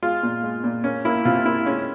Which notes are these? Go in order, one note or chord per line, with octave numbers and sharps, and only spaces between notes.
G#3 F4
A#2
G#3
A#2
A#3 C#4
A#3 E4
C3 F4
A#3 E4
G#3 C#4